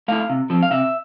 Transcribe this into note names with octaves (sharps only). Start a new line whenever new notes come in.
A3 E4 F5
C3
F3 C4
F5
C3 E5